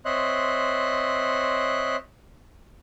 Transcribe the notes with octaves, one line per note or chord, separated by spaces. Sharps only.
C4 C#5 D#5 E5 C6 F#6